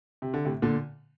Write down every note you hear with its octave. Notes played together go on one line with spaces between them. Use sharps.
C3
D3
A2 C3
A#2 D3